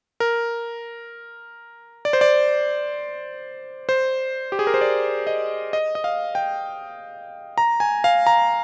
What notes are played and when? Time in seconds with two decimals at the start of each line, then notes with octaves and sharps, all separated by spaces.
0.20 A#4
2.05 D5
2.13 C5
2.21 D5
3.89 C5
4.52 G4
4.59 G#4
4.67 A#4
4.74 C5
4.81 D5
5.27 D#5
5.73 D#5
5.95 D#5
6.04 F5
6.35 G5
7.58 A#5
7.80 G#5
8.04 F5
8.27 A#5